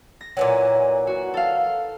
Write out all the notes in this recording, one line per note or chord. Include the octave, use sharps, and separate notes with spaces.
A#6
A#2 E3 F#3
F#4
A4 F5